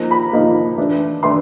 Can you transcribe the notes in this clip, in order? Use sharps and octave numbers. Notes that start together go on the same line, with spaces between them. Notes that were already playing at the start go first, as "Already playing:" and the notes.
Already playing: F3 A#3 D#4 A#5
B5
F3 A#3 D#4
E3 A3 D4
E3 A3 D4 C6